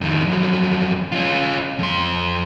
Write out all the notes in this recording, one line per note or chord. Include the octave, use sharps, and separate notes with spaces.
F2 D#3
F2 F#3
C#4 F4
F2 C6